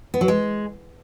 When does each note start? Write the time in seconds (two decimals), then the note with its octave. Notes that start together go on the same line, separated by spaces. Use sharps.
0.14 B3
0.21 F#3
0.28 G#3